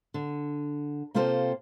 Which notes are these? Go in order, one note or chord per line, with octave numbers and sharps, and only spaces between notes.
D3
C3 A#3 C4 F4 A4 C5